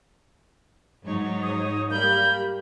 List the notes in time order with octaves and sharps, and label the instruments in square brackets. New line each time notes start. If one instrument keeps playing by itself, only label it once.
[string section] G#2 F#3 [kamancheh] D#4 C#5
[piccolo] D#6
[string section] G3 [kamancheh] A#3 B5 [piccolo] G6